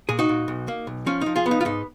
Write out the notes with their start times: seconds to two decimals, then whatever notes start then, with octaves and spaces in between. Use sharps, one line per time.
0.09 A#2 G#4
0.19 D#4 F#4
0.29 A#2
0.48 B1
0.68 A#3
0.87 B1
1.06 F3 C#4
1.21 F3 D#4
1.36 F4 G#4
1.46 B3
1.51 D#4
1.61 F4
1.65 G#2 D#4